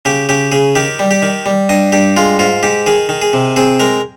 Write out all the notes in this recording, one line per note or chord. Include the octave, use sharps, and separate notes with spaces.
C#3 G4
C#3 G4
C#3 G#4
D#3 G4
G3
G4
D#3
G3
G2 D#5
G2 G4
G#3 F4
G#2 F4
G#2 G4
D#3 G#4
D#3
G#4
C3
C4 G#4
G#3 A#4